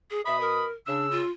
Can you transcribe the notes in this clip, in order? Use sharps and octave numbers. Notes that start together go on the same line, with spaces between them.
G#4
B2 E5 B5 D#6
A#4
C#3 D4 E6
F4